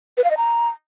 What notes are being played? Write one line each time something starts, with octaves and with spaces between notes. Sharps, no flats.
B4
F5
D#5
A#5